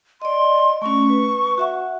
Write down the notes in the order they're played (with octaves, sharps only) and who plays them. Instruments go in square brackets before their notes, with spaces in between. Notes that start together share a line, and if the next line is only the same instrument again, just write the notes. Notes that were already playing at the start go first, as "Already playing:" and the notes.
[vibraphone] D5 D#5 [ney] C6
[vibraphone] A3 C#4 [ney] C#6
[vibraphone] B4
F#4 E5 F#5